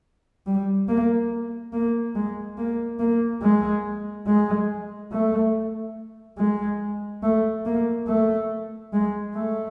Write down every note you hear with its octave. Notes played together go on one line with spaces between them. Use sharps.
G3
A#3
A#3
G#3
A#3
A#3
G#3
G#3
A3
G#3
A3
A#3
A3
G#3
A3